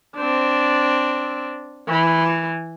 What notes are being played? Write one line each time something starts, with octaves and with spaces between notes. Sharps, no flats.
C4 D4
E3